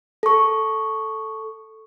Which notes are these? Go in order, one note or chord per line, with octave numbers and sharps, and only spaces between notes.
A4 C#6